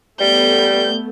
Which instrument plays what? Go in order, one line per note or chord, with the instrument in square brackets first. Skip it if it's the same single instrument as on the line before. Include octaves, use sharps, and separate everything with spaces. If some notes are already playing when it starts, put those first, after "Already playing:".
[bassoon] G3 [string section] A3 B3 [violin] G6